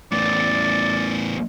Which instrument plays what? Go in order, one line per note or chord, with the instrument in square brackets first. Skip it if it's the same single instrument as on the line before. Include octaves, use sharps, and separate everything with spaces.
[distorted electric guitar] E2 A2 [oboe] D5